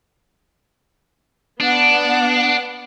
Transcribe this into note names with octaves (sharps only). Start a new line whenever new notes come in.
B3 D4 F#5